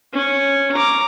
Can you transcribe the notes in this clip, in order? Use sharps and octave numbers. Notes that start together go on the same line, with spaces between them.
C#4 C#5
A#5 D6